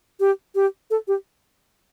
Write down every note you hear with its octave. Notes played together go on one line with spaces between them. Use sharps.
G4
G4
A4
G4